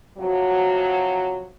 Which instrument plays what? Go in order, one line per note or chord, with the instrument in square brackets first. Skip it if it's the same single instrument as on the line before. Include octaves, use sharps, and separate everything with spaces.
[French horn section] C3 F3 F#3